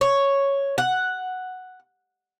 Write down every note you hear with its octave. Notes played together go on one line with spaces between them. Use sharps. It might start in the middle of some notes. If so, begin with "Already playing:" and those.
C#5
F#5